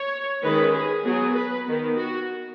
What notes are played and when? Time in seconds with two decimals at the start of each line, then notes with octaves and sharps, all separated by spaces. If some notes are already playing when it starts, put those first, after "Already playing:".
Already playing: C#5
0.43 D#3 G#3 C#4 B4
0.74 G#4
1.04 F#3 B3 G#4
1.35 B4
1.65 D#3 B3
1.95 F#4